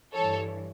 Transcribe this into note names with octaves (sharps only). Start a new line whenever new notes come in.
E3 A4 C#5
G2